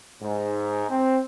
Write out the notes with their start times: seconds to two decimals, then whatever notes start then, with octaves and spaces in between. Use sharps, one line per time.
0.21 G#2
0.88 C4